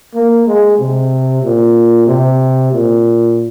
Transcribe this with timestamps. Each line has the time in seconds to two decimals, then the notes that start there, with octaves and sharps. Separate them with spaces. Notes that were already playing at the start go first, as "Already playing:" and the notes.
0.15 A#3
0.47 G#3
0.79 C3
1.43 A#2
2.07 C3
2.72 A#2